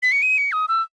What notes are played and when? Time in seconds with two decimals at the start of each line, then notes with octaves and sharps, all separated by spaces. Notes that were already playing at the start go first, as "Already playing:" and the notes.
0.03 B6
0.12 C#7
0.22 D#7
0.38 C#7
0.52 D#6
0.68 E6